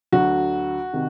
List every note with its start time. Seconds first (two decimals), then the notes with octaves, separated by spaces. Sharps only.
0.12 D2 D3 F#3 F#4
0.93 C3 D#3